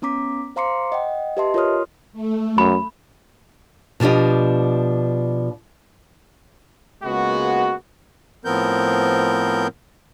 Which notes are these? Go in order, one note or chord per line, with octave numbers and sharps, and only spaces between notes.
B3 C#4 A#5 D6 B6
C5 F5 A#5 C6 D6 C#7
D#5 F#5 G5
G4 B4 D#5 E5 A5 C6
F4 A#4 C#5 C6 D#6 F6
A3
F#2 B5
B2 F3 D4 G4 D#5
C#2 G#3 A#3 B3 F#4
A2 F3 B3 C4 A#4 G6